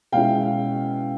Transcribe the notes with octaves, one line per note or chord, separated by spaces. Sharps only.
B2 G#3 C#4 E4 F5 G5